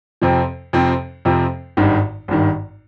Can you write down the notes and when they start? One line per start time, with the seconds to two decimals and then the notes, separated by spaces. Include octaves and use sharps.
0.22 F2 C3 F3 C4
0.73 F2 C3 F3 C4
1.25 F2 C3 F3 C4
1.77 G#1 G2 D#3
2.28 G#1 G2 D#3